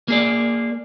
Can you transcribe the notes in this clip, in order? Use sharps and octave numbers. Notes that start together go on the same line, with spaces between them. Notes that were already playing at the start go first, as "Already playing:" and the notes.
A#3 G#4 D5